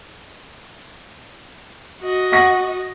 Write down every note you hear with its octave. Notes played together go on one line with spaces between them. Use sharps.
F#4 D#5
F#5 C#6 A#6